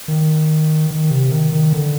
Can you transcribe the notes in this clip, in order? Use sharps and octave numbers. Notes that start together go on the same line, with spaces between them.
D#3
D#3
C3
D#3
D#3
D3